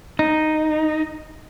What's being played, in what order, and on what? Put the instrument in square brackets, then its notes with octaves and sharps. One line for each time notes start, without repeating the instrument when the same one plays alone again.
[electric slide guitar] D#4